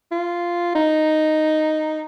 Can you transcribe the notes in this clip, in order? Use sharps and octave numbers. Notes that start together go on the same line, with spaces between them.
F4
D#4